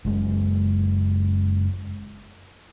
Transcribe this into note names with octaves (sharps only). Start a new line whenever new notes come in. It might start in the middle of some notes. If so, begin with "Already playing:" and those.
F#1 G#3